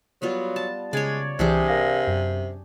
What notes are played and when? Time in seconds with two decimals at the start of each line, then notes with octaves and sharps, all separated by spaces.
0.22 F#3 G3 B3 F4
0.56 A5
0.93 C#3 G#3 C#5 D5 G#6
1.39 C2 C3 E3 D4 G4 G#4
1.68 A#4 F5 A#6
2.07 F#2